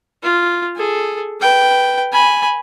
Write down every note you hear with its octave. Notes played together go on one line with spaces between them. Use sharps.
F4
G#4 A4
B4 G5
G#5 B5